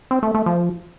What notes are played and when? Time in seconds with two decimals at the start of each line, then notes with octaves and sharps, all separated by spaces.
0.11 C4
0.23 A3
0.34 A3
0.46 F3